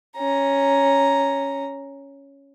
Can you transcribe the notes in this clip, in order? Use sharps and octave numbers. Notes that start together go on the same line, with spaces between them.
C#4 A#5